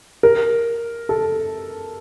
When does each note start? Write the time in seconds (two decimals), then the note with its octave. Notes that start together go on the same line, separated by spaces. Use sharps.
0.23 A#4
1.09 A4